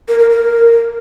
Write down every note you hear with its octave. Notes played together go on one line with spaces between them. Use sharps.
A#4
A#4
A#4